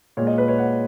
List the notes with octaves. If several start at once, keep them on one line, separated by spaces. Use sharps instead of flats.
A#2 G#3 C#5
D#5
B4
C#5
F#5